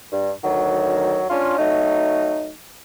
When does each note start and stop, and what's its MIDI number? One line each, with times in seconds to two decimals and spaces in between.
0.12 0.31 43
0.43 1.24 38
0.43 1.24 51
0.43 1.24 54
1.30 1.56 61
1.30 1.56 62
1.30 1.56 65
1.58 2.50 54
1.58 2.50 57
1.58 2.50 63